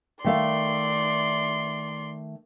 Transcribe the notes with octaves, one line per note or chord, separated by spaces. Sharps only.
D#3 A3 D5 F5 C6